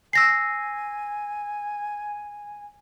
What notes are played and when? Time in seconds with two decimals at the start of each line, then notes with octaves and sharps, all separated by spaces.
0.13 G#5 E6 A#6 C7